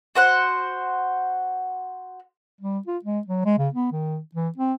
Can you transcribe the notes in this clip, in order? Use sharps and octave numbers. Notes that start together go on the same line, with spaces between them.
F#4 C5 F#5
G3
F4
G#3
F#3
G#3
C#3
B3
D#3
E3
C4